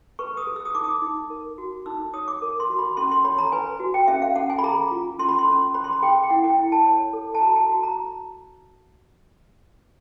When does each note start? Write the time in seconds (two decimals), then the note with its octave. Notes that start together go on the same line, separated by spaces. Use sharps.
0.19 B4 C#6
0.37 D#6
0.47 G#4
0.56 E6
0.65 D#6
0.75 D#4 D6
0.83 D#6
1.02 D#4
1.30 A#4
1.58 F#4
1.86 D#4 E6
2.14 C#5 D#6
2.28 D6
2.42 A#4
2.60 C6
2.69 F#4
2.79 B5
2.97 C#4 C6
3.11 C6
3.25 C#5 B5
3.38 A#5
3.52 B4 G#5
3.80 F#4
3.94 G5
4.08 C#4 E5
4.22 F5
4.36 C#4 F#5
4.50 G#5
4.59 B5
4.63 G#4 A#5
4.91 F4
5.19 C#4 C6
5.29 B5
5.38 C6
5.47 C#4
5.74 C5 B5
5.84 C6
5.92 B5
6.03 G#4 G5
6.23 G5
6.30 E4 F#5
6.44 G5
6.58 E4
6.72 A5
6.86 C#5
7.13 A4
7.35 A5
7.41 F#4 A#5
7.56 A5
7.70 F#4
7.83 A#5